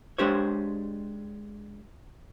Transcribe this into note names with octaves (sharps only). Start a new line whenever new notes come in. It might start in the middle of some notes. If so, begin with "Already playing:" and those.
G#3 D4 G4 C5 C#5